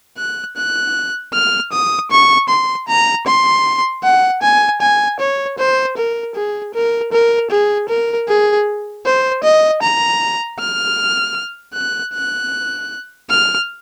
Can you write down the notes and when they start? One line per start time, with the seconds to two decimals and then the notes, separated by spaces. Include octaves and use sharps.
0.18 F#6
0.56 F#6
1.34 F6
1.72 D#6
2.11 C#6
2.49 C6
2.88 A#5
3.27 C6
4.04 F#5
4.42 G#5
4.81 G#5
5.20 C#5
5.59 C5
5.97 A#4
6.36 G#4
6.74 A#4
7.12 A#4
7.51 G#4
7.89 A#4
8.29 G#4
9.05 C5
9.44 D#5
9.83 A#5
10.59 F6
11.75 F#6
12.14 F#6
13.30 F6